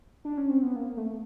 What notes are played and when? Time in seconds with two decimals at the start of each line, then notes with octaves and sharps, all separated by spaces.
0.25 D4
0.38 C#4
0.50 C4
0.63 B3
0.76 A#3
0.97 A3